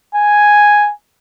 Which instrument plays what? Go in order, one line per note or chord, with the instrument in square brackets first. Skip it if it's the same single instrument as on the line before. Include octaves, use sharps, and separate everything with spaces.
[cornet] G#5